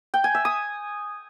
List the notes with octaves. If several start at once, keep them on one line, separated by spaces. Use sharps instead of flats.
G5
G#5
E5
D#6